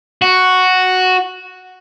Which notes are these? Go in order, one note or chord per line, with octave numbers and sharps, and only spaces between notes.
F#4